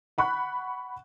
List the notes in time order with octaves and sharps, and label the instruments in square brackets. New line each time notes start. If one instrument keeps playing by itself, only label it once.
[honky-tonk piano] F#5 B5 C#6 F#6